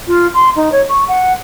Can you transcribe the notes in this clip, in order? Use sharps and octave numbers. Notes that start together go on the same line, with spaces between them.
F4
C6
D#4
C#5
C#6
F#5